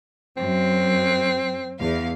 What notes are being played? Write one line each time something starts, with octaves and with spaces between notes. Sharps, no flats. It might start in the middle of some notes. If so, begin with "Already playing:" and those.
F#2 C4
E2 F5